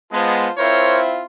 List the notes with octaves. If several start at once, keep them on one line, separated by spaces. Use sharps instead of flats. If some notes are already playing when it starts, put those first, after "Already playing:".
G#3 B3 F4 C5 A5
C4 E4 F4 A#4 C5 C#5